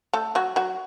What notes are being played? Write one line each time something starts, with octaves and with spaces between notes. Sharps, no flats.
A3 A4
F#3 F#4
F#3 F#4